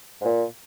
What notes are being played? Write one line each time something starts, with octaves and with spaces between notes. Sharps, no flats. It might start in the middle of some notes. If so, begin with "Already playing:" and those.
G#2
A#2